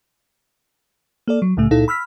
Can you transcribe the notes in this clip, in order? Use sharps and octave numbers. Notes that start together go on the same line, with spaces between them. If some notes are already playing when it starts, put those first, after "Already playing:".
A#3 A4 D5
F#3
C2 A2 C#3 A3
C#2 A#2 D#4 E4 A4
B5 E6 F6 B6